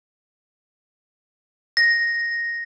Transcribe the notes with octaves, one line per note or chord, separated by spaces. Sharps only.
A#6